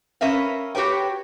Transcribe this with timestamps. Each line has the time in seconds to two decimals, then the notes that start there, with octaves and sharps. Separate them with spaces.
0.21 C#4 A#4 B4 E5 F5
0.75 F#4 G4 B4 C#5 G5